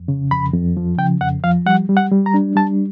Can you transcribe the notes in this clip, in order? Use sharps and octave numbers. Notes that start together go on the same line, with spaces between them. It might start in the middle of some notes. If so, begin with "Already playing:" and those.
Already playing: F2
C#3
F2 B5
F2
F3
C#3 G5
F2 F#5
F3 F5
G3 F#5
G3
F#5
G3
A#5
D4
G3 A5